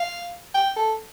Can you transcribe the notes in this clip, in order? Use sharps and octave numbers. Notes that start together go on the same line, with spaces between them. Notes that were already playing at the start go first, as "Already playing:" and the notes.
Already playing: F5
G5
A4